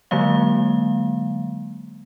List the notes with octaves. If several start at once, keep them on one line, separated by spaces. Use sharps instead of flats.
D3 F#3 G#3 A#3 F5